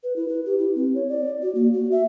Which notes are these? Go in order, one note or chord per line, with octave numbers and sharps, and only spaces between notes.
B4
E4
B4
G4
E4
C4
C#5
D5
F#4
A#3
F#4
E5